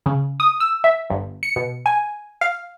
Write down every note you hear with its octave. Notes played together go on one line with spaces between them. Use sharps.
C#3
D#6
E6
E5
G1
C#7
B2
G#5
F5